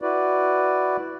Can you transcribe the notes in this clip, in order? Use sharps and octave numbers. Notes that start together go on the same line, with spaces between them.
E4 F#4 B4 D5